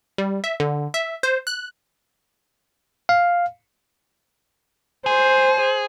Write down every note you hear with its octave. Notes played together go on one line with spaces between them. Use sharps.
G3
E5
D3
E5
C5
F#6
F5
G#4 C5